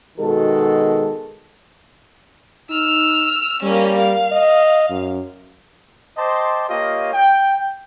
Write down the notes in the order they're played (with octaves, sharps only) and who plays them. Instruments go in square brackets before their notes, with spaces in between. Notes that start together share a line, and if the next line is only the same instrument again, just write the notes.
[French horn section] B2 D#3 G#3 F#4 A4
[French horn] D#4 [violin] E6 F6
[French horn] G3 [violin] A#3 C#4
[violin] F5
[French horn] D#5
F#2
[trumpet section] C5 D#5 G5 A5 C6 D6
A#3 F4 G4 C#5 D#5 F5
G5